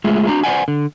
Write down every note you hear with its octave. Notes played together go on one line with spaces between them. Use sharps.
G#3 A3 F4 G#4 E5
D4 F#4 A#5
C5 D5 F#5 G#5
D3